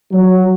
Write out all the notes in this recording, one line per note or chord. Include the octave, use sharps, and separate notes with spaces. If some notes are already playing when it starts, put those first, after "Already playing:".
F#3